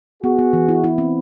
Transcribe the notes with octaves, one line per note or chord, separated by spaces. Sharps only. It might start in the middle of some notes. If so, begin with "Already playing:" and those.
B3 F#4 G#4
B3
E3
E4
E4
C4